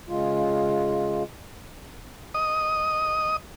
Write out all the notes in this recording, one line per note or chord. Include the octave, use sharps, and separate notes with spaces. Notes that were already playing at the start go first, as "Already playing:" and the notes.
C#3 G#3 F4
D#5 D#6